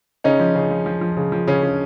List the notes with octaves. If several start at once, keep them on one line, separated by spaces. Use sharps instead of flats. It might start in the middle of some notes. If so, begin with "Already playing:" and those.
C#3 C#4 D#4
F3
C#3
F3
F3
F3
C#3
F3
C#3 C#4
C#3